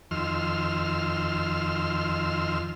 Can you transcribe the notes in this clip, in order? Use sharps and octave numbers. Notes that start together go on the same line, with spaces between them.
F2 D#3 C6 E6 F6